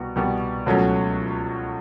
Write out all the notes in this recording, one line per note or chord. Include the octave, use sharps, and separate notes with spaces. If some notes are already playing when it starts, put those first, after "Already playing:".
Already playing: C2 B2 G3 B3 F#4
C2 B2 G3 B3
C#2 B2 F#3 A3 C#4